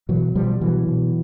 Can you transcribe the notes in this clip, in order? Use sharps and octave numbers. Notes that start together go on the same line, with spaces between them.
B2 E3 F#3
B2 F3 G3
B2 E3 F#3
B2